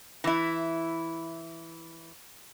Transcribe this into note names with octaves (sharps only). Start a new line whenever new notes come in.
E3 E4